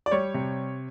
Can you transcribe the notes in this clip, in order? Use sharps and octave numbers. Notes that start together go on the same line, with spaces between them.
D5
G3 C#5
C3